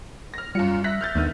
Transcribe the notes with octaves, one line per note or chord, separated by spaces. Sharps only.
F6 A#6
F#2 G3 F4 C#7
E5 F#6 A#6 B6
F6 G6 A6
D#2 D3 D#3 B3